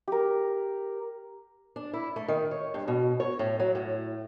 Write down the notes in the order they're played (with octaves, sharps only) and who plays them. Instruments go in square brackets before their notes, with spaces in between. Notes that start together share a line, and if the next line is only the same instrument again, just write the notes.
[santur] G4 A#4
[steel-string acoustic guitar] D4
E4
A3
D#3
C#5
G2
B2
C#5
A2
F#3
A2